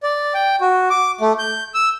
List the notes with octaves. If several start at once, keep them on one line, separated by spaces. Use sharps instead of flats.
D5
G5
F#4
D6
A3
G6
E6